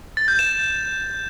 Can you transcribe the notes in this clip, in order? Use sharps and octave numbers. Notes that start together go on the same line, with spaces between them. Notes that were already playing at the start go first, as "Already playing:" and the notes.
A6
G6
E7